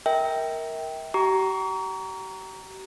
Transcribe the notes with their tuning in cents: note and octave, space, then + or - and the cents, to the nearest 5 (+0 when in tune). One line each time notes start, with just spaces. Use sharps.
A#4 +0 E5 -35 G5 +0
G4 -40 A#5 +0 C#6 +40